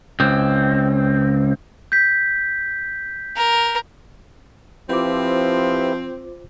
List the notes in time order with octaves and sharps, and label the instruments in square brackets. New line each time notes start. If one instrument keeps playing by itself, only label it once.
[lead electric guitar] C#2 C4
[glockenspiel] G6 B6
[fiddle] A#4
[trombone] F3 [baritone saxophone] C4 [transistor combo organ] E4 G4 B4 [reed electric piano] F4 C5 D6